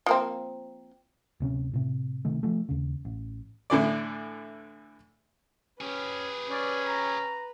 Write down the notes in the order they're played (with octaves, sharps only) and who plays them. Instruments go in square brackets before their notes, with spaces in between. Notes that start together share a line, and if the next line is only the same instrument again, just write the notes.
[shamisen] F3 A#3 C4
[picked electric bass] D1 C3 C#4
A2 C3
C3 D#3 A3
F3 A3
D#2 C#3
A1
[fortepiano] A2 D3 E3 D5
[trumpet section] C#4 [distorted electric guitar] G4 G#4 [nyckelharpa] B4
[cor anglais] C#4 [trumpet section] D5
[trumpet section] A#5